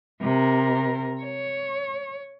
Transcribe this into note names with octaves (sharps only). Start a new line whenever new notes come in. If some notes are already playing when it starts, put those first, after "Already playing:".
C3 A#4
C#5